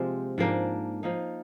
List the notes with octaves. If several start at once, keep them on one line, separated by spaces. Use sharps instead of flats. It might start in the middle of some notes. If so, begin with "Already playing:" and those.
Already playing: C3 F3 G#3 A#3 C4
G#2 F3 A#3 D4
F3 A#3 D#4